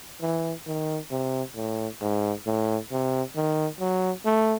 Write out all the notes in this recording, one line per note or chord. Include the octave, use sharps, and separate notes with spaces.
E3
D#3
C3
A2
G#2
A2
C3
D#3
F#3
A3